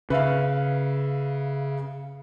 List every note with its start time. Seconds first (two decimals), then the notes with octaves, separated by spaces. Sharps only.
0.10 C#3 B4 E5 F5